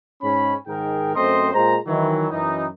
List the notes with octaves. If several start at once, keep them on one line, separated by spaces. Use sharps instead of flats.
G#2 C#4 B5
G#2 D#3 G#4 A#4 G5
F#2 A3 C4 C5 D#5 C6
A#2 G#3 C5 A#5
D#3 E3 F#3
F#2 E3 D#4